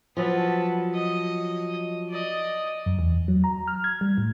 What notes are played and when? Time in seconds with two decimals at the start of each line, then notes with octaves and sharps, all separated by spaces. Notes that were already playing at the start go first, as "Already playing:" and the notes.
0.17 F3 F#3 B4 A5
0.95 D#5
2.09 D5 D#5
2.86 F#2
2.99 E2
3.28 F#3
3.44 A#5
3.68 F6
3.84 G#6
4.01 G3
4.18 A2